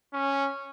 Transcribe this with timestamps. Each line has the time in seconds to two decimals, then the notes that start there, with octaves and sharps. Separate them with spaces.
0.13 C#4